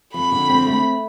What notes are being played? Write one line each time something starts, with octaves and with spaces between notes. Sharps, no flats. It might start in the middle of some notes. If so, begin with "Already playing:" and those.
F2 B5
D3
C4
A3